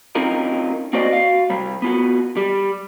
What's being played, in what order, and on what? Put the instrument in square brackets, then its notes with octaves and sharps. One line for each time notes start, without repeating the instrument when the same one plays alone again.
[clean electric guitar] C4 C#4 D#4 F4 A#4
A#3 C4 F#4 C5 D5 D#5
F#4 F5
C3 G3
B3 F4 F#4
G3